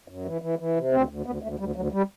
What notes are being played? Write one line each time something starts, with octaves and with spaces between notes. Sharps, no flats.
F#2
E3
E3
E3
C3
D2 C4
D2
D2 B3
D2 A3
D2 G3
D2 F#3
G3